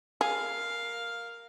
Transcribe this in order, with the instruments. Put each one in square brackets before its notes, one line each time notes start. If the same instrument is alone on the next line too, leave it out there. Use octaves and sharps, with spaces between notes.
[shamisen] G#4 [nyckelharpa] A#4 F5